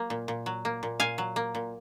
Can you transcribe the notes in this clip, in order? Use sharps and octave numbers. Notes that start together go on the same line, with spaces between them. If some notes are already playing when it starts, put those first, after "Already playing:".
Already playing: F#3 A#3
A#2
A#2
F#3
A#3
A#2
A#2 F5 G#5
F#3
A#3
A#2